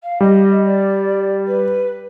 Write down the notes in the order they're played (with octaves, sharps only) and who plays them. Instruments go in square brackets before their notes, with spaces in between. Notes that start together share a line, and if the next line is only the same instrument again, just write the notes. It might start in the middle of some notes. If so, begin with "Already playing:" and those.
[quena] F5
[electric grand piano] G3 [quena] D#5
[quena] D5
B4